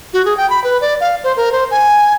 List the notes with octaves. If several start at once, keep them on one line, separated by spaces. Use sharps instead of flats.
F#4
G#4
G5
B5
B4
D5
F5
C5
A#4
C5
G#5